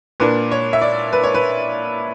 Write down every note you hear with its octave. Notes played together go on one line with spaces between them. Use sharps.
A#2 A#3 D4 B4
C#5
E5
D5
B4
C#5
B4